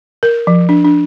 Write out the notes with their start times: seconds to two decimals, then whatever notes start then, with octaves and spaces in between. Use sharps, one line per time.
0.23 A#4
0.47 F3
0.69 D4
0.84 D4